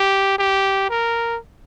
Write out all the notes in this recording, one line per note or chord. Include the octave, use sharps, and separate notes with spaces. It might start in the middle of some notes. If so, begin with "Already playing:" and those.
Already playing: G4
G4
A#4